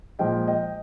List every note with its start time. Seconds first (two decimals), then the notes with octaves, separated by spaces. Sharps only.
0.19 A#2 F3 G#3 D#5 G5
0.48 D#5 G5